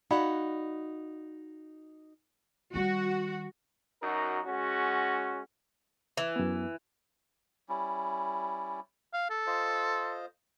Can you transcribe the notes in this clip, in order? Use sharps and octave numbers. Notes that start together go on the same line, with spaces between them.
D#4 F#4 D5 F5 F#5 B5
D#3 G3 F#4
F#2 D#4 F#4 A#4
G#3 C#4 F#4
E3
F#2 B3
G3 C#4 E4
F5
A4
F4 C5 D#5